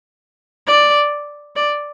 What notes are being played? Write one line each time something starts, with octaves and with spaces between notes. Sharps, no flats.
D5
D5